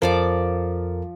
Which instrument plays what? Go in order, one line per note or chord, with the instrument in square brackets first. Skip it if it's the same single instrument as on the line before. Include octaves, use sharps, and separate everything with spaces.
[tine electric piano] F2 A4 A#4 [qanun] F3 D5 D6